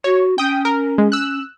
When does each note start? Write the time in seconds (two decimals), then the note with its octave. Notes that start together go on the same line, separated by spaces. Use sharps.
0.04 F#4 C#5
0.38 C#4 G5 D#6
0.65 A#4
0.98 G#3
1.12 E6 F#6